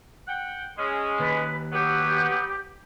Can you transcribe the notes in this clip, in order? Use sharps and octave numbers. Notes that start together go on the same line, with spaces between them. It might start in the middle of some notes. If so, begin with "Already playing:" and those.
F#5 G5
G#3 C#4
D#2 B4
F#3 B3 G4